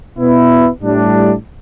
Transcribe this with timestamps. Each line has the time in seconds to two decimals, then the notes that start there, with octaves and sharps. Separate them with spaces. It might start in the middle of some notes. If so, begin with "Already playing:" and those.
0.18 B2 B3 E4
0.82 A2 G3 D4